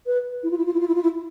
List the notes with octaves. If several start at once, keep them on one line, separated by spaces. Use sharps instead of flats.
B4
E4
F4
E4
F4
E4
F4
E4
F4
E4